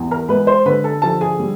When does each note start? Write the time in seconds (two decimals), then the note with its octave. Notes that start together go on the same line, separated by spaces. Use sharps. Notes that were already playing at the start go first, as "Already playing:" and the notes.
Already playing: E2
0.11 A#4 A#5
0.29 G#3 B4 B5
0.47 C5 C6
0.66 D3 B4 B5
0.84 A4 A5
1.02 F3 A4 A5
1.21 G#4 G#5
1.39 G3